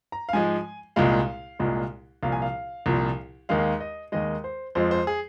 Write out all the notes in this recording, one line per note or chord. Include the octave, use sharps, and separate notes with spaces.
A#5
F5
G#2 F3 G#3 G#5
C2 A#2 G#3 F5
C2 A#2 G#3
C2 A#2 F3 F5
G#5
F5
C2 A#2 F3
D#2 D#3 G#3 F5
D#5
D#2 D#3 G#3 D#5
C5
F2 F3 G#3 C5
C5
G#4